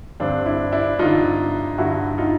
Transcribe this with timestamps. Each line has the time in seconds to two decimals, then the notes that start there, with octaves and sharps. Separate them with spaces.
0.20 G2 D3 C4 D4
0.46 D4 E4
0.72 D4 E4
0.99 G2 D3 D#4 F4
1.78 G2 D3 E4 F#4
2.18 D#4 F4